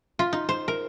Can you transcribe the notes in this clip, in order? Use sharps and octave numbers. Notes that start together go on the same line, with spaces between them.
F4
D#4
C5
A#4